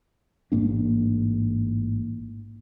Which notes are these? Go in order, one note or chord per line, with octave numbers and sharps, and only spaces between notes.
A1 G#2 A#3 D4